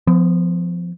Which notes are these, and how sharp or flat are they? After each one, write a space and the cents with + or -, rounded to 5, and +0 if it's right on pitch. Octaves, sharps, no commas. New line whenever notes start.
F3 +0 B3 +40